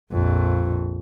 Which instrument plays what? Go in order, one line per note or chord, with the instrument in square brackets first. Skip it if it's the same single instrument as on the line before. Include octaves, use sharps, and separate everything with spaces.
[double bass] A#1 F2